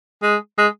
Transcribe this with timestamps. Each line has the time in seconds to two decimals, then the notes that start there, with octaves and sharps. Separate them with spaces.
0.23 G#3
0.58 G#3